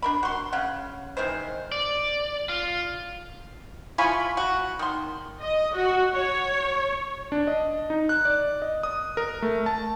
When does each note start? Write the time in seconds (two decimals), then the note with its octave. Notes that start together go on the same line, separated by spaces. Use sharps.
0.02 D4 A#4 B5
0.23 F#4 C6
0.53 C#3 F#5
1.17 D#3 E3 G#3 C5
1.72 D5
2.49 F4
3.98 F3 E4 F4 G#5 B5 C#6
4.37 F#4
4.79 D#3 C6
5.41 D#5
5.75 F#4
6.14 C#5
7.32 D4
7.47 D#5
7.90 D#4
8.09 F#6
8.25 D5
8.62 D#5
8.83 D#6
9.17 A#4
9.42 A3
9.66 A5